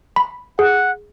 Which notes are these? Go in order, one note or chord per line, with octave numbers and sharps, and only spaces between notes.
B5
G#4 F#5